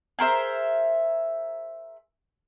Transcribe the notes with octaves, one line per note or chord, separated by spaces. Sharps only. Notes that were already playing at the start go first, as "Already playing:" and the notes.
G#4 A#4 C5 E5